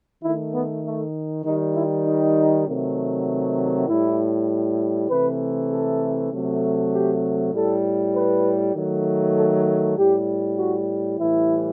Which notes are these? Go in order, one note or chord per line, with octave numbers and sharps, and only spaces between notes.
D#3 A3 E4
B3
A3
D#3 G3 D#4
E4
D#4
C3 D#3 F#3 A3
A2 G3 E4
C3 E3 A3 B4
A4
C3 F#3 A3
G4
A2 G3 A4
B4
D#3 F#3 A3
A4
A2 G3 G4
F#4
A2 E3 G3 E4